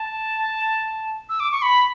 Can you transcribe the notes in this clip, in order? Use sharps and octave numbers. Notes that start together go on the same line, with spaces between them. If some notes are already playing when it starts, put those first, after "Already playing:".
Already playing: A5
E6
D6
C#6
B5